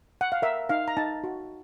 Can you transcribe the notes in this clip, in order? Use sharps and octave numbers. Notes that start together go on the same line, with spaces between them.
F#5
F5
A#4 E5
D#4 F5
A#5
D#4 A5
F#4